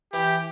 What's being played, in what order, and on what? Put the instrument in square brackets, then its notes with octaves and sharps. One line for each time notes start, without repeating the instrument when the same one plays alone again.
[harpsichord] E3 [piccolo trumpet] G4